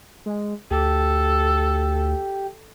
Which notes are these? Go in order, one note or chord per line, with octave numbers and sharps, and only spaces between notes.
G#3
D2 G4 A4